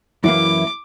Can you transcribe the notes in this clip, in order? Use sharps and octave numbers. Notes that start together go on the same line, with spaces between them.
F#2 E3 A#3 E4 D6